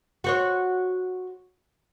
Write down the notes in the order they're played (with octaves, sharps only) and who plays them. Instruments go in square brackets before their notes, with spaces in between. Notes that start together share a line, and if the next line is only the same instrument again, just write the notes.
[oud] F#4 C5 C#5